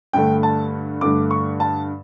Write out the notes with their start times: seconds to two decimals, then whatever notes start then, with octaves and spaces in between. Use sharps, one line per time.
0.13 G2 D3 A3 G5
0.43 A5
1.01 G2 D3 A3 D6
1.31 C#6
1.60 A5